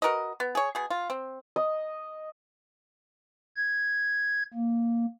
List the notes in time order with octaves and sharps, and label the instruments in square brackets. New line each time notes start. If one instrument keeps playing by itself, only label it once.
[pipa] F#4 A#4 B4 D#5
B3
G#4 C#5
B2 G#4
F4
C4
[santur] D#5
[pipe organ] G#6
A#3